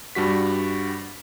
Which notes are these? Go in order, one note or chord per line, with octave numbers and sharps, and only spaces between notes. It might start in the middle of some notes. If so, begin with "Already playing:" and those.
G2 G3 F#4 B6